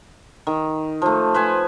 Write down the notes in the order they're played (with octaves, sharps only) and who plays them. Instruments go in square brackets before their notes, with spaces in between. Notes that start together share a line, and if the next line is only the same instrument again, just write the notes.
[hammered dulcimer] D#3
F3 A3
B4 C5 G#5